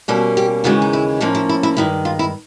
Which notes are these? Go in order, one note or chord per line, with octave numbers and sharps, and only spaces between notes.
B2 G3 A#3 C#4 A4
G4
D#2 C#3 E3 G#3 F#4
D#4
E4
A2 F3 A#3 C#4 D#4
E4
E4
E4
G2 D#3 G#3 E4
F4
E4